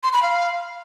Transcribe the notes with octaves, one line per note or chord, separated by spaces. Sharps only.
C6
B5
F5